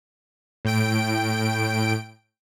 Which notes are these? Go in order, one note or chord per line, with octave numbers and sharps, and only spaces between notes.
A2 G5 D7